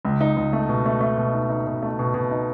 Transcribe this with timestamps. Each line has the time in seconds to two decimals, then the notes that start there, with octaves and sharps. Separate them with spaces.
0.05 C#2
0.21 D#4
0.37 C#2
0.53 A3
0.69 B2
0.86 A3
1.01 A3
1.18 B2
1.34 D#4
1.50 D#4
1.67 B2
1.83 A3
1.99 B2
2.14 B2
2.31 D#4